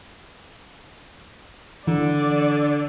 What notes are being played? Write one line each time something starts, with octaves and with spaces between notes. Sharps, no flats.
D3 E3 D5